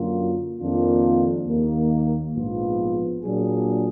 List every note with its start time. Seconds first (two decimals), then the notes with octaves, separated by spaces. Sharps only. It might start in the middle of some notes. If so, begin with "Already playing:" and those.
Already playing: F#2 D3 F#3 A#3 F4
0.59 F2 D#3 A#3 D4 F4
1.47 D#2 D#3 A#3
2.34 A#1 G#2 F3 B3 F4
3.23 A#2 F#3 D4 G#4